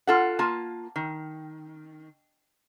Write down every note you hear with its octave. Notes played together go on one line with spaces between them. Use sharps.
F4 A4 F#5
A#3 F4 A5
D#3